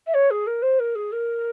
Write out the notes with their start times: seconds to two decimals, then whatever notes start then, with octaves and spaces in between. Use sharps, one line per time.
0.06 E5
0.14 C#5
0.30 G#4
0.46 A#4
0.62 C5
0.79 A#4
0.95 G#4
1.12 A#4